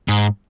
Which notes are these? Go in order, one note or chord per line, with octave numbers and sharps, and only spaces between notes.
G#2